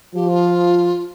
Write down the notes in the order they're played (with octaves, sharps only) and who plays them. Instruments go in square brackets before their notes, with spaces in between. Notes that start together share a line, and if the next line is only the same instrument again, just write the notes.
[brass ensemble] F3 [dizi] G4
[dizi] F4